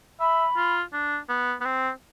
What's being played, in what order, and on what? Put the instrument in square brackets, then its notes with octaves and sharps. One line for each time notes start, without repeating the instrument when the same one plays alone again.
[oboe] E5 [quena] B5
[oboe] F4
D4
B3
B3
C4